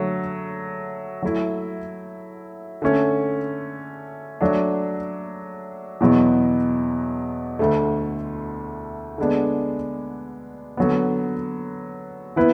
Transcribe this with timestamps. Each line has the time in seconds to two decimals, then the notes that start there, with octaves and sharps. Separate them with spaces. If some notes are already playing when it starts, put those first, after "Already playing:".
Already playing: D3 F#3 A3
1.22 F#3 A3 E4
2.82 D3 A3 C#4
4.41 F#3 A3 D4
6.00 E2 B2 F#3 B3
7.59 D2 D3 A3
9.18 D3 G#3 B3 D4
10.77 D3 F#3 B3
12.36 E3 B3 E4 B4